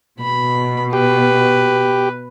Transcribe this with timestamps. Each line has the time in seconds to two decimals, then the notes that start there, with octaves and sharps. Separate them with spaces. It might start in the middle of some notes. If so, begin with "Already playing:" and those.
0.20 B2 B5
0.93 G4 B4